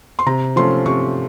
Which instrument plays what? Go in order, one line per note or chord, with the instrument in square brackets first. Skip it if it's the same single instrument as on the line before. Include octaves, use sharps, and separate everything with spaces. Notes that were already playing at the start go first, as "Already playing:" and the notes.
[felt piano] C6
C3 A#5
F3 A3 C#4 C6
C3 C#6